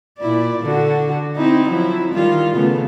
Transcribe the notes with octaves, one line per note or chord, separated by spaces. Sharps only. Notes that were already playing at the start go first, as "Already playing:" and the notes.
A#2 E4 D5
D3 F#4
C4 D#4 E4
F3 F#3 E4
D#3 G3 F4
C#3 A3 B3